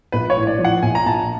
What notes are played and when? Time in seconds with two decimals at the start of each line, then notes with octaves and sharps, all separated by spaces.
0.12 A#1 B4
0.30 C#5
0.36 A2
0.47 D5
0.59 F3
0.65 F#5
0.83 A#1 G#5
0.95 A#5
1.06 A#1 A5